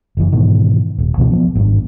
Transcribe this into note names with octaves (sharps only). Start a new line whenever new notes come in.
F#1 E3
G#2 B2 D#3 E3
D#1
C#2 B2 E3 C4
F3 A#3 B3
G#1 G2